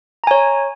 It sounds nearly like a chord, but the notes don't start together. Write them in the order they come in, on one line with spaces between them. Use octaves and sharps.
A#5 G#5 C#5